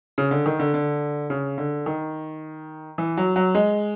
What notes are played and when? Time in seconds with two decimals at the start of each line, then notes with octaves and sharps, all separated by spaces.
0.18 C#3
0.31 D3
0.46 D#3
0.60 D3
0.74 D3
1.30 C#3
1.58 D3
1.86 D#3
2.98 E3
3.17 F#3
3.36 F#3
3.55 G#3